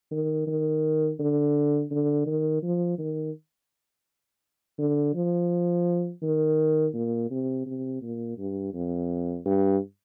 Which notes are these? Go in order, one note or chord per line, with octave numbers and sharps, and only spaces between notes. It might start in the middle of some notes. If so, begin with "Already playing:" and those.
D#3
D#3
D3
D3
D#3
F3
D#3
D3
F3
D#3
A#2
C3
C3
A#2
G2
F2
G2